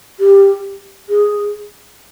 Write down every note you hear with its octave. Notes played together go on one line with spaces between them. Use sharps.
G4
G#4